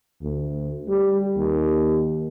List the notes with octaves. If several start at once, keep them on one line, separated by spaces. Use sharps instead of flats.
D2
G3
D#2